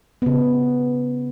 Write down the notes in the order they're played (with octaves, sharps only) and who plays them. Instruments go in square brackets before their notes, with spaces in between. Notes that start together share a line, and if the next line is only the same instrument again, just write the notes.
[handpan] C#3 B3